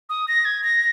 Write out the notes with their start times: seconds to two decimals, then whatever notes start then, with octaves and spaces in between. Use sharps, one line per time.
0.09 D#6
0.28 A#6
0.45 G#6
0.64 A#6